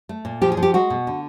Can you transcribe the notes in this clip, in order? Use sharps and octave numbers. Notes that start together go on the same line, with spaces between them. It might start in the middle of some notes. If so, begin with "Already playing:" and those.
A3
A#2
F3 G4
G#4
F3
G4
G#3 F#4
B2
D3